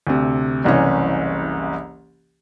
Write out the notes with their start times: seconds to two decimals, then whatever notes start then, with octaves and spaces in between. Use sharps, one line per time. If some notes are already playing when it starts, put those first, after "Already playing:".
0.07 D2 C3
0.64 F#1 C2 E3 C#4